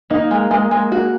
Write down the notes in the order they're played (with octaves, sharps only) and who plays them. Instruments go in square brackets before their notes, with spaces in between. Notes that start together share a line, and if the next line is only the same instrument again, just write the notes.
[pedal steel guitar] A#3 [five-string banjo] D#4
[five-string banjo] G#3
G#3
G#3
F#4